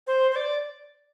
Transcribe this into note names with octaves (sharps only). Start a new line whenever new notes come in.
C5
C5
D5